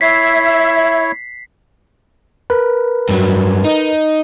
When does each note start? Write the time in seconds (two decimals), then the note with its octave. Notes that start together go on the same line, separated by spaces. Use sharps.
0.01 E4 C#5 E5 B6 C7
2.50 A#4 B4
3.09 G2 F#3
3.65 D#4